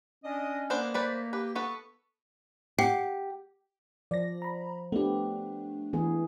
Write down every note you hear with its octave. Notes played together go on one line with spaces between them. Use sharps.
C#4 D4 D#5
A#3 B3 D4 C5
A3 B4 C5 D5
G4 B4
B3 A4 B4 C#6
G4 F#5 G5 C7
F3 D5 A#6
A#5 B5
A3 B3 D4 G4
E3 B3 G#4